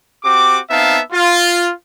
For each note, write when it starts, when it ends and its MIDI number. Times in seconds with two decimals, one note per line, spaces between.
0.24 0.59 60
0.24 0.59 66
0.24 0.59 67
0.24 0.59 86
0.70 0.99 59
0.70 0.99 60
0.70 0.99 63
0.70 0.99 76
0.70 0.99 77
0.70 0.99 81
1.12 1.70 65